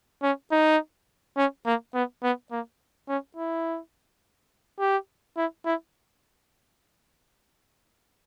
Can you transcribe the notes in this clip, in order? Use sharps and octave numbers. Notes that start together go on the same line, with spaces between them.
C#4
D#4
C#4
A#3
B3
B3
A#3
C#4
E4
G4
E4
E4